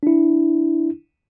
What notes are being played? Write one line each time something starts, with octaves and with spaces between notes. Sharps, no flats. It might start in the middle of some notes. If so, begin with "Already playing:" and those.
D4 E4